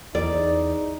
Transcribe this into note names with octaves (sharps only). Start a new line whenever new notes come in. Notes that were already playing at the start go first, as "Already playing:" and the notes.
E2 D#4 D5